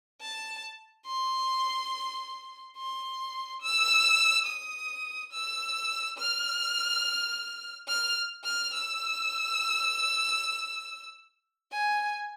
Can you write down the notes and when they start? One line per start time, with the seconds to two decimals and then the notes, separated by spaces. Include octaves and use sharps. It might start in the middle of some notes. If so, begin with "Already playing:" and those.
0.21 A5
1.06 C6
2.77 C6
3.62 E6
4.47 D#6
5.32 E6
6.18 F6
7.88 F6
8.44 F6
8.73 E6
11.72 G#5